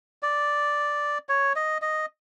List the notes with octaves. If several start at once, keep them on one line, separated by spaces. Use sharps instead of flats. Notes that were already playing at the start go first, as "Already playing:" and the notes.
D5
C#5
D#5
D#5